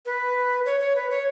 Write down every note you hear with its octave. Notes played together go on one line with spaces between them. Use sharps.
B4
C#5
C#5
B4
C#5